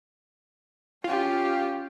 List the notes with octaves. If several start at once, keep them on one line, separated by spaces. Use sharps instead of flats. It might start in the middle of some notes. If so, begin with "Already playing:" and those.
C#4 F4 G4